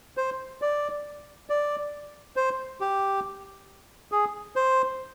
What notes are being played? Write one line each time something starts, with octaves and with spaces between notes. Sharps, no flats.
C5
D5
D5
C5
G4
G#4
C5